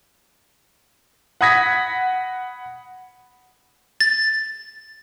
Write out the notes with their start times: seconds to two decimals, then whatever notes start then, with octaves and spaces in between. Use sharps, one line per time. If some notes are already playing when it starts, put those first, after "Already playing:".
1.41 F#5 B5 D#6 G#6 A#6 B6
4.00 A6